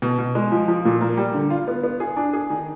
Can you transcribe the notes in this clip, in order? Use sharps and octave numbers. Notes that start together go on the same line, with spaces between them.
B2
B2
G#3
F3
F3
A#2
A#3
G3
D3
F4
B3
B3
G#4
D4
G#4
D#3